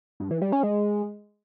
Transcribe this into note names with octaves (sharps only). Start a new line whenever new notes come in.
G2
E3
G3
C#4
G#3